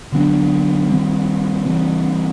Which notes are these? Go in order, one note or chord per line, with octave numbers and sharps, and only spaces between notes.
D3 F#3 B3 D4
D#3 G3 C4
C#3 E3 G3 C4